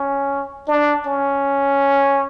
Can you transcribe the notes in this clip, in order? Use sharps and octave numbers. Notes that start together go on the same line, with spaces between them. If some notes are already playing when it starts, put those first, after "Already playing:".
Already playing: C#4
D4
C#4